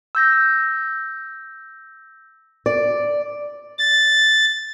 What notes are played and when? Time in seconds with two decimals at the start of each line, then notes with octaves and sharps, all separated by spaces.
0.15 E6 G6 A#6
2.66 D5
3.79 A6